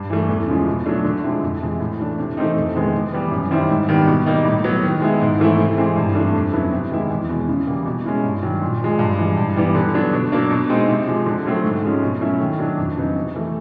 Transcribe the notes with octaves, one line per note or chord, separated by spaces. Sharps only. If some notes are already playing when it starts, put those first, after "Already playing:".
Already playing: G2
E3 A3
E2
C#3 F3 G#3
B2
F#3 A3 D4
D3
F3 G#3 C4 E4
F2
C3 E3 G#3
A2
E3 A3 D4
C3
E3 A3 C4 D#4
F2
C3 D#3 G#3 B3
C3
E3 G3 B3
F#2
D#3 G3 C4 E4
G#2
D#3 G3 B3
B2
G3 A#3 D#4
A2
F#3 B3
D#3
G#3 B3 E4
G#2
E3 A3 C4 E4
C3
E3 G#3 C4
G2
E3 A3 D4
F2
C#3 F#3 B3 E4
C3
D#3 G#3 B3 E4
E2
B2 G#3
C#3
E3 G3 A#3
B2
G#3 C#4 E4
G2
D#3 F#3
A#2
F3 G#3
G2
E3 G#3
G2
E3 G3 B3
D3
F#3 B3 D4
B2
F#3 A#3 D4
B2
G#3 C4 D#4
C3
F3 G#3
D3
F#3 A3 C4
G#2
F3 G#3 C#4
B2
F#3 A3 C#4 E4
D#3
F#3 A#3 D4
F2
C#3 F#3 B3 D#4
C3
E3 A3